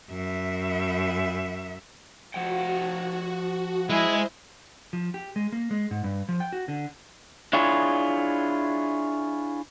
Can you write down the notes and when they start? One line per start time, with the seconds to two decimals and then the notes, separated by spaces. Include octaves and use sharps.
0.10 F#2 E5
2.34 F3 F#4 F#5 G5
3.90 G#3 E4 G#4 C5 D#5
4.93 F3
5.14 G4
5.36 G#3
5.52 A#3
5.71 G#3
5.91 G#2
6.04 G2
6.29 F3
6.40 G5
6.53 F#4
6.68 D3
7.53 D4 E4 F4 G#4 C#5